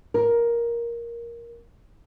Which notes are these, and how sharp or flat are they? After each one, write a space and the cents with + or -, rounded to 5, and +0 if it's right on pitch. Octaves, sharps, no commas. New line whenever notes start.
A#4 +10